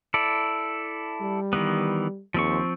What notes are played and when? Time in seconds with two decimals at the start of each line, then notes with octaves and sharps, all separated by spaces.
0.14 E4 A4 D5
1.21 G3
1.53 D#3 E3 B3
2.34 D#2 F3 C4 C#6